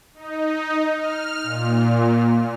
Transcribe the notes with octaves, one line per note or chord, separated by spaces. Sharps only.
D#4
F6
A#2